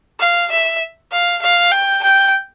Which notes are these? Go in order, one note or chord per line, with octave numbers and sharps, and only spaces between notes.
F5
E5
F5
F5
G5
G5